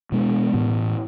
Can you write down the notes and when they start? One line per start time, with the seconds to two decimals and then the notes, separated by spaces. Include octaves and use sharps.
0.12 B2 G#3 B3 D4
0.53 A2 E3 B3